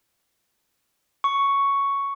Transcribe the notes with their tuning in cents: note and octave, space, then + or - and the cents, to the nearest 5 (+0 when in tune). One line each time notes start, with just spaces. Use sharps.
C#6 +5